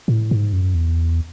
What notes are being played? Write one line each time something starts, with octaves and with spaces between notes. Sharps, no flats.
A2
G#2
F#2
E2